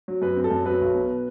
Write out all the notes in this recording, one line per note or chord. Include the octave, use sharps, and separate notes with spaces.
F#3
F#2 B4
C4
A4
F#2
F#3 B4
B1
B2